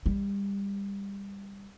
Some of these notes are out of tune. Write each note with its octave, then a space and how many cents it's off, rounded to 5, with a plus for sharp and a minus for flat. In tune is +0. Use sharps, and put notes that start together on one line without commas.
G3 +25